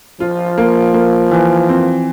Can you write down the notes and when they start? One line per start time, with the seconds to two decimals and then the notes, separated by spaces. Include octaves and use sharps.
0.20 F3 F4
0.58 A#3
0.94 A#3
1.31 E3
1.69 C4